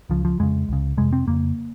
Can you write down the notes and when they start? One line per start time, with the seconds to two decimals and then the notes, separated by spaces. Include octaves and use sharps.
0.10 C#2 C#3 F3
0.25 F3
0.39 F2 C#3 G#3
0.69 C#2 C#3
0.97 F2 C3 G#3
1.13 C4
1.27 F2 C#3 A#3